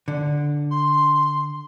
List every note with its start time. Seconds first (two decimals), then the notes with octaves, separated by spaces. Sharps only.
0.08 D3
0.71 C6